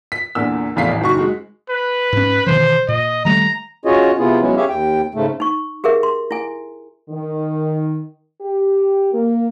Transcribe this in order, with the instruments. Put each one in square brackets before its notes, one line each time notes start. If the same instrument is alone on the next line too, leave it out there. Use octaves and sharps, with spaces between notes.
[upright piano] B6
E2 A#2 D3 E6
F1 E2 A2 F5 B6 C7
A1
F#1 D#3 F#4 C#6
G#3 F#4
[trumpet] B4
[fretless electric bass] G#2 C#4
[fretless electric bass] B2 D#3 E3 [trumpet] C5
[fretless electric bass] A#2 [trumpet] D#5
[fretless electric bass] D#3 G3 A3 [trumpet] A#5
[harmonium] C#4 F4 F#4 G#4 C#5 D#5
C3 B3 E4 F4 G#4
F#3 G#3 B3 C#4 E4
G4 G#4 C#5 E5 F5
D#2 G5
G#2 C#3 A3
[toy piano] D#4 C#6
G4 G#4 A#4 E5
C6
E4 G#5
[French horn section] D#3
G4
A#3